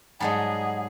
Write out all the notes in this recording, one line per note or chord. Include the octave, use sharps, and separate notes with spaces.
G#2 F#3 G3 G#4 D#5 F#5 A5